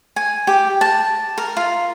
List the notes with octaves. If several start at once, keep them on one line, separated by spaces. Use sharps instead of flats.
G#5
G4
A5
A#4
F4